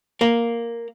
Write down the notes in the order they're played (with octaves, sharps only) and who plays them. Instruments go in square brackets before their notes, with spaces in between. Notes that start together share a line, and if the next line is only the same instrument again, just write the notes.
[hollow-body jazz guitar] A#3